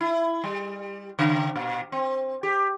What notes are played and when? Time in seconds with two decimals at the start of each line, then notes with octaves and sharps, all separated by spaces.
0.01 E4
0.44 G3
1.19 C#3
1.56 A#2
1.92 C4
2.43 G4